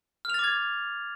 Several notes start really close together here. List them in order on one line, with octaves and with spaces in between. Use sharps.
F6 F7 A6 D6 G#6